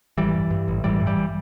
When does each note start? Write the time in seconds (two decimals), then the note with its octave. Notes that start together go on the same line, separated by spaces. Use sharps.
0.18 A1 E3 G3
0.34 G2
0.51 G2
0.68 A1
0.84 A1 E3 G3
1.01 G2
1.06 E3 G3